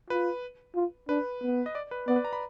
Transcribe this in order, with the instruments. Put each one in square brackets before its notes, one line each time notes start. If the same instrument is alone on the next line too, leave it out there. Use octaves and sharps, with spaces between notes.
[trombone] F4 [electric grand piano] B4
[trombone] F4
[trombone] D4 [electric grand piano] B4
[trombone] B3
[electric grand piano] D#5
D5
B4
[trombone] B3 [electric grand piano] D5
[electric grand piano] B4
A#5
B5